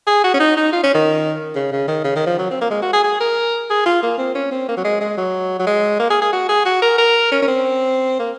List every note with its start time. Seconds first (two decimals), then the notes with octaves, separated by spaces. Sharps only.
0.07 G#4
0.24 F#4
0.34 C#4
0.40 D#4
0.57 D#4
0.73 F4
0.84 C#4
0.95 D#3
1.55 C#3
1.72 C#3
1.88 D#3
2.04 C#3
2.16 D#3
2.26 F3
2.38 F#3
2.51 C4
2.61 A#3
2.71 G#3
2.82 F#4
2.93 G#4
3.04 G#4
3.20 A#4
3.70 G#4
3.86 F4
4.03 A#3
4.18 C4
4.35 C#4
4.51 C4
4.68 A#3
4.77 F#3
4.84 G#3
5.01 G#3
5.17 F#3
5.59 F#3
5.67 G#3
5.99 A#3
6.10 G#4
6.22 G#4
6.33 F#4
6.49 G#4
6.65 F#4
6.82 A#4
6.98 A#4
7.32 C#4
7.42 C#4
7.48 C4
8.19 A#3